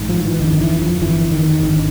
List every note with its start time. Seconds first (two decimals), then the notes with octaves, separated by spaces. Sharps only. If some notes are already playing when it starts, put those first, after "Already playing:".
Already playing: A1 G#2
0.09 F3
0.25 E3
0.39 G1 F2 D3 D#3
0.61 E3
0.81 F3
1.02 G1 F2 D3 E3
1.32 D#3
1.63 G#1 G2 D3 D#3